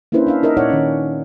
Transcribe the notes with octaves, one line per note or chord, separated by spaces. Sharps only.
A#3 C#4 D4 E4 B4 C5
D4 E5 F5
D#4 A#4 D#5 E5
A#2 D#4 C#5 D5 E5 F#5
D#3 C#4